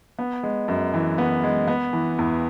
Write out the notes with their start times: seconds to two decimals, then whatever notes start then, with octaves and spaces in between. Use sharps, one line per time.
0.19 B3
0.43 G#3
0.68 F#2
0.94 E3
1.18 B3
1.44 G#3
1.68 B3
1.93 E3
2.19 E2